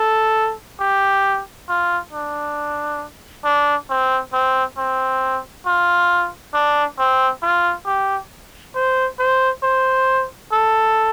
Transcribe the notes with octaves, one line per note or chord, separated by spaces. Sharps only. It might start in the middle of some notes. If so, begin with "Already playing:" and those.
Already playing: A4
G4
F4
D4
D4
C4
C4
C4
F4
D4
C4
F4
G4
C5
C5
C5
A4